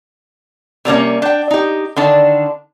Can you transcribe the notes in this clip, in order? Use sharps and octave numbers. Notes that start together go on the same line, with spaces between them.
C3 G3 A#3 C#4
D4 G5
D#4 G4
D3 D#3 D4